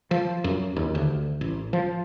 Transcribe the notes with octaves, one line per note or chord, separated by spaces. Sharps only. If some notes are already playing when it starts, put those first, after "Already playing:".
F3
F#2
D#2
D2
A1
F3